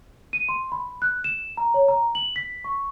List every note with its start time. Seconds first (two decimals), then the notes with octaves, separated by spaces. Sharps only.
0.33 D#7
0.49 C6
0.72 B5
1.02 F#6
1.24 E7
1.57 A#5
1.74 C#5
1.88 A#5
2.15 F#7
2.36 B6
2.64 C#6